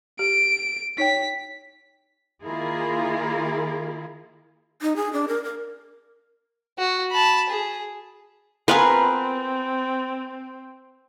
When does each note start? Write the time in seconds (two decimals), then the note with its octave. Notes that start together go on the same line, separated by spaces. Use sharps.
0.19 G4 D7
0.98 D#4 C#5 G5 B6
2.44 D#3 A#3 E4 F4 G#4 A#4
4.82 D#4
4.96 G#4
5.13 D4
5.28 A#4
5.44 A#4
6.79 F#4
7.12 A5 B5
7.50 G#4
8.68 B3 C4 F4 G#4 A#4 B4